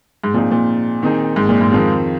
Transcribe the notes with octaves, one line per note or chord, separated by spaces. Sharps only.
G#2
A#2 F3 C4 D#4 G#4
A#2
D#3 C4 D#4 G#4
G#2
A#2
G#2
F2 D#3 C4 F4 G#4